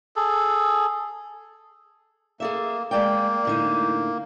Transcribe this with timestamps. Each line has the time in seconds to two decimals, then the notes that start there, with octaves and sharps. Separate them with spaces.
0.16 G#4 A4
2.40 A#3 G#4 A4 E5
2.91 G#3 A#3 D5 G5
3.45 A2 D3 D#4